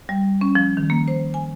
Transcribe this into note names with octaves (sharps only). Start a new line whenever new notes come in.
G3
C#4
F3
D#3
A#3
C5
G#5